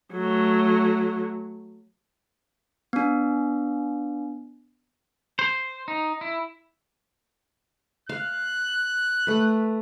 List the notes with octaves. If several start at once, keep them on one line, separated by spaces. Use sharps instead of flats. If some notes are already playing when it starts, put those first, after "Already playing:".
F#3 A3
B3 D4
C5
D#4
E4
F5 F#6
A3 B4